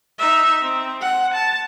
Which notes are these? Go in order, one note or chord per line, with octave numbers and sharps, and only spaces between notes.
D#4 E5
C4
F#5
A5